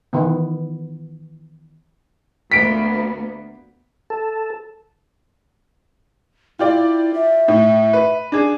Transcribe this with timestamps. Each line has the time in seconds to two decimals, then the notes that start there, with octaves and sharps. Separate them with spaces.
0.13 D#3 E3 B3
2.52 D2 A#3 B3 B6 D7
4.10 A4
6.59 E4 F4 G4 D5
7.14 E5
7.48 A2
7.93 B4
8.32 D4 G#4